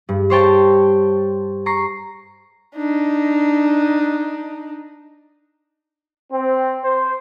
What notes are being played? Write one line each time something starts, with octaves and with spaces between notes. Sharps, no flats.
G2
C5 C#5 G5 A5
A#5 C#6 C7
D4 D#4
C4
C5